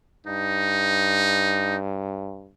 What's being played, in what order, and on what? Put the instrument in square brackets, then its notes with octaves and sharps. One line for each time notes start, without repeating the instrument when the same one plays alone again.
[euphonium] G2 [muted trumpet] D#4